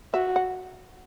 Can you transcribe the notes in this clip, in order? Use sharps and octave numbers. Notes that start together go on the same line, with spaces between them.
F#4 E5
F#5